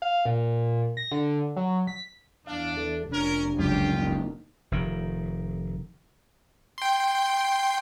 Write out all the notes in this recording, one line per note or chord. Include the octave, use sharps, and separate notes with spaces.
F5
A#2
A#6
D3
F#3
B6
E2 D4 F5
E3 A4
F1 C#4 D4 A#4
F#1 C#2 F#2 F4 G4
A#3 D#4
F1 D#3
G5 C6